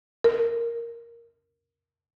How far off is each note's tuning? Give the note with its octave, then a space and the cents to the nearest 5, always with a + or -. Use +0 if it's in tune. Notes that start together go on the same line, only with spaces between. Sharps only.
A#4 +0